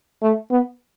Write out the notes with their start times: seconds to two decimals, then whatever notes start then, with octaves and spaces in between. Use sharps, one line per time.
0.22 A3
0.51 B3